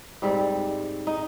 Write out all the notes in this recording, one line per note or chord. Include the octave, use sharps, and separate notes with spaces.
G#2 G3 C4
D#4